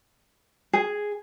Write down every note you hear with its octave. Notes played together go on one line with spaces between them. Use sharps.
G#4